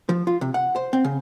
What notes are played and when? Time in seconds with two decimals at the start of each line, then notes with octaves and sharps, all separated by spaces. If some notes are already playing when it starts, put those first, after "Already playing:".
0.09 F3
0.27 F4
0.41 C3
0.54 F#5
0.76 C5
0.93 C4
1.05 C#3